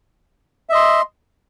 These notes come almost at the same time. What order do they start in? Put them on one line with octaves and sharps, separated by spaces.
E5 D#5 C6